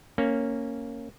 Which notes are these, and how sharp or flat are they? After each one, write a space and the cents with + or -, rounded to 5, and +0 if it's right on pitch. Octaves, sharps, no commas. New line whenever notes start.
A#3 -10 C#4 -5